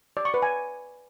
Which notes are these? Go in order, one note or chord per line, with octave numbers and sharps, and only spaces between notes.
D5
C#6
B4
G#5